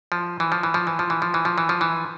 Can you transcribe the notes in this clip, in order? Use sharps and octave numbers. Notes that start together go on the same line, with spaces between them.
F3
E3
F3
E3
F3
E3
F3
E3
F3
E3
F3
E3
F3
E3